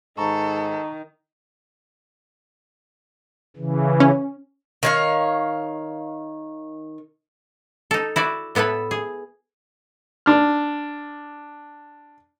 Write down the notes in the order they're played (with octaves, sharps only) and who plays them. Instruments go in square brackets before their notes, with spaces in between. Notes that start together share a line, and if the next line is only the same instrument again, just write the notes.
[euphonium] G#2 [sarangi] D#3 [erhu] A4 [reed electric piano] A#5 C#6
[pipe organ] C#3 E3
[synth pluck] C#4
[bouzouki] D#3 C#5 F5
[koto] D#4 A4
E4 F#4 D5
A2 B3 E4 A4 B4
G#4
[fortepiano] D4 F6